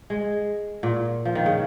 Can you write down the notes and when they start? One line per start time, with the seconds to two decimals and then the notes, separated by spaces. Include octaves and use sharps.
0.10 G#3
0.83 A#2
1.25 F3
1.35 D#3
1.46 C#3